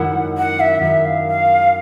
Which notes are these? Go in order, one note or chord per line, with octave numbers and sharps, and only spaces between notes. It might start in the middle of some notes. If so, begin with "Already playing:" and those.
Already playing: F#2 D#3 G#3 C#4 E4 F#5
F#5
E5
F#2 D#3 G#3 E5
F5
F5